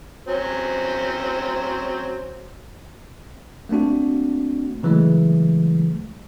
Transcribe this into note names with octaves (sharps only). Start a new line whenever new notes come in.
F#3 C4 C#4
A3 A#3 C4 D4 F#4
C#3 E3 F#3 G#3 A3